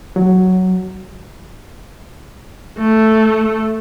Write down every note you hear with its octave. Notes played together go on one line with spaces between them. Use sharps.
F#3
A3